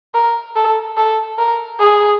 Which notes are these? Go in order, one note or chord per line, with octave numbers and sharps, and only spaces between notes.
A#4
A4
A4
A#4
G#4